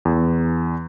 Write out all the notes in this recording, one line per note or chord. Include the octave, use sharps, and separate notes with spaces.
E2